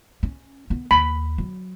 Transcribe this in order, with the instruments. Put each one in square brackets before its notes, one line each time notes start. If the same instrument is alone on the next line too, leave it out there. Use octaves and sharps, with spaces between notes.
[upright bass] C#4
B3
[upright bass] D#2 [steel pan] B5
[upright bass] F#3